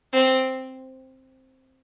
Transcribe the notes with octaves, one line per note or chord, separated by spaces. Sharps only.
C4